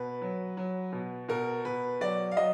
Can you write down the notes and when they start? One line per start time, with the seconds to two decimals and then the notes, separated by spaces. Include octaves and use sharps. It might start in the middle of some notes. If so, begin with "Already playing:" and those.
Already playing: B2 B4
0.21 F#3
0.57 F#3
0.92 B2
1.28 B2 A#4
1.65 B2 B4
2.01 F#3 D5
2.31 F5
2.37 F#3 D#5